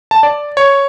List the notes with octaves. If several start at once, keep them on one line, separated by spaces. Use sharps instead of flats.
A5
D5
C#5